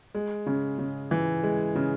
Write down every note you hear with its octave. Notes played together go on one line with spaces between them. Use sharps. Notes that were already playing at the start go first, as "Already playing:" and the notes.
G#3
C#3
C#3
E3
G#3
C#3